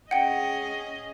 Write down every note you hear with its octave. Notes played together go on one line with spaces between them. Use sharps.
C#4 G#4 D#5 F#5 G5